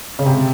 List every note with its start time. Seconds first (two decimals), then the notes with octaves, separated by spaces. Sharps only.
0.19 C#3
0.26 C3